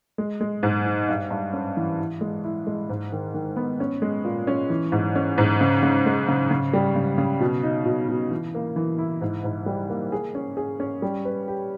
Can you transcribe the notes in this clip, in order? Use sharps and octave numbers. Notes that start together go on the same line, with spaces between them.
G#3
G#3
G#2
D#4
G2
G2
C#4
E3
E4
G#3
E4
G#3
G#2
D#3
D#3
B3
C#4
G#3
A#2
C#4
E3
G#2
C#4
G#2
C#3
C#3
G#3
C#3
C#3
G3
C#3
C#3
B2
D#4
B2
B2
E3
A#3
E3
E4
G#2
G#2
G3
A#3
G#4
C#4
G#4
C#4
G3
B4
G4